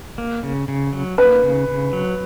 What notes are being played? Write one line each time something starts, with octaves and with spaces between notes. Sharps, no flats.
A#3
C#3
C#3
F#3
A#3 B4
C#3
C#3
F#3